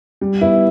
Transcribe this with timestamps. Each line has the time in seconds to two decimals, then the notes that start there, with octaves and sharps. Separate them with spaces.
0.21 G3
0.41 B3 E4